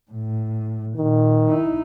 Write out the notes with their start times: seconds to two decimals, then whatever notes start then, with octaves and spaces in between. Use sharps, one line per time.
0.11 A2
0.97 A#2 D#3
1.49 D#4 E4